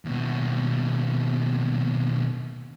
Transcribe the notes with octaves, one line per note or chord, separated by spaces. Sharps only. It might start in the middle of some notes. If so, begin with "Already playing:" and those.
D#2 B2